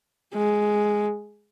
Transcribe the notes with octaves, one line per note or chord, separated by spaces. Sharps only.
G#3